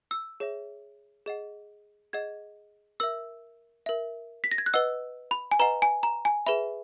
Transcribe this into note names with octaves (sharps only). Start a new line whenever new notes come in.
E6
G#4 C#5 E5
G#4 D#5 F#5
G#4 D#5 F#5 G#6
A#4 E5 E6
A#4 E5
B6
A#6
G#6
F#6
B4 D#5 F#5 E6
B5
G#5
B4 D#5 F#5 A#5
G#5
A#5
G#5
G#4 B4 E5 B5